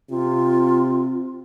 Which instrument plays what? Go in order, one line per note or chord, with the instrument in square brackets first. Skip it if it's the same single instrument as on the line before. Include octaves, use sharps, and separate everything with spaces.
[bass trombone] C3 [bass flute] F4